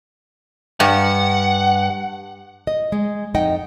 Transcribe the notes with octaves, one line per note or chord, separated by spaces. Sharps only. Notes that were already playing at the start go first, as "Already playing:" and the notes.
G2 F#5
D#5
G#3
F2 D#4 D#5 F#5 G5